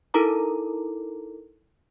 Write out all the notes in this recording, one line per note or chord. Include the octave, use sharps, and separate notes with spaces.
D#4 E4 A4 A#4 A#5 D6